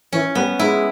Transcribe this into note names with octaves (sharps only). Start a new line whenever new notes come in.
E3 C#4
G3 B3
G#3 E4